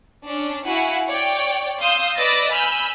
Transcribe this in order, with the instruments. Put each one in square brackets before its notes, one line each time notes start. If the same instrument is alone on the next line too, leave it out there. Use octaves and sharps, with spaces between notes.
[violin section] C#4 D4
E4 F#4 F5 F#5 G#5
C#5 D5 G5
F5 C6 D#6 E6 G6
B4 D5 D#5 E6 A6 A#6
G#5 B5 E6 F6 G6